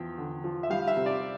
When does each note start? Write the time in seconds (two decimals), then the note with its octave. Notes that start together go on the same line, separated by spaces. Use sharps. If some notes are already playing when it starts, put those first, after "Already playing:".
Already playing: E2 F3 G5
0.18 D3
0.44 F3
0.63 E5
0.70 G3 F5
0.88 E5
0.97 C3
1.06 D5